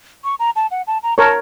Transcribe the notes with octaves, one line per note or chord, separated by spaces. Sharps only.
C#6
A#5
A5
F#5
A5
A#5
A#4 C#5 A5